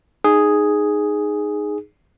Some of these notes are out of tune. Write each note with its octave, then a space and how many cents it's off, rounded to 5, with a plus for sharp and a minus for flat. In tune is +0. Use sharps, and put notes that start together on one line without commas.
D#4 -15 G#4 +0